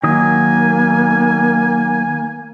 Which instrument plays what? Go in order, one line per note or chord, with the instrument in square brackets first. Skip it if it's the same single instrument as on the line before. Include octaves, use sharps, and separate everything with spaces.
[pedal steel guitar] D#3 F#3 D#6 [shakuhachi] A#3 [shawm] G#5